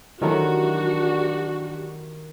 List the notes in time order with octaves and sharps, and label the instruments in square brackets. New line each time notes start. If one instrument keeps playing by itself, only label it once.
[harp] D#3 [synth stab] E3 F#3 A3 [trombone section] D4 [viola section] F#4 G4